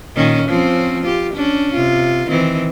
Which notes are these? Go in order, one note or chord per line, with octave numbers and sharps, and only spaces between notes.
A#2 D#3 C#4
F3 C4 C#4
F4 G4
C#4 D4
C3 F4
D#3 E3 C4